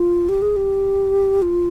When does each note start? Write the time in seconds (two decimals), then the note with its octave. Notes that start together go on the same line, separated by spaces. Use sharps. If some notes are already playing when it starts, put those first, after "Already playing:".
Already playing: F4
0.29 G4
0.42 G#4
0.56 G4
1.42 F4